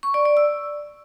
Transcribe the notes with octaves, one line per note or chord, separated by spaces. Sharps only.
C#6
D5
D5
E6